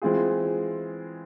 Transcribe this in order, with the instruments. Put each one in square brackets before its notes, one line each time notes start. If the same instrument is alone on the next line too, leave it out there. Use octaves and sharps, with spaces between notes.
[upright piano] E3 G#3 C4 F4 G#4